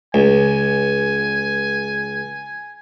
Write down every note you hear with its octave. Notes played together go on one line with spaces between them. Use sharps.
C#2 G#5